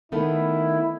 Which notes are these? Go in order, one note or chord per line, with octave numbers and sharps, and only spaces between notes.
D#3 A3 B3 E4